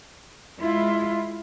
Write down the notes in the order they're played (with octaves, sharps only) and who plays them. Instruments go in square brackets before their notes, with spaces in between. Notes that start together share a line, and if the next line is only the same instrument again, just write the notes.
[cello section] G#3 E4 F4